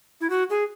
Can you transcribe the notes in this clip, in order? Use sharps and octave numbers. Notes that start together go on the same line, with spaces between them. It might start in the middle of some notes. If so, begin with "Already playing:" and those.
E4
F#4
G#4